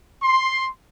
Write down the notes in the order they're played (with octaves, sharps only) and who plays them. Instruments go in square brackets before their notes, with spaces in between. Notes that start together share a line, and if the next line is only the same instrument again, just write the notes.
[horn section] C6